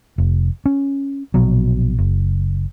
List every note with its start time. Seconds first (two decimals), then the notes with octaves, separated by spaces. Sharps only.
0.18 F1
0.66 C#4
1.34 A#1 B2 F#3
1.98 F#1